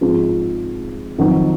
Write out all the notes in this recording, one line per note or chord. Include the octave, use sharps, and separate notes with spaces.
G#2 F3 G#3 C4 F4
F2 D#3 F#3 C4 D#4